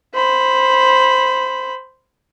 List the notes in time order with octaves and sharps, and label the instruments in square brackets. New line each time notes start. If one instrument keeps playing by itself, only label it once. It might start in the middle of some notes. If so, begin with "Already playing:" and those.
[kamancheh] C5 B5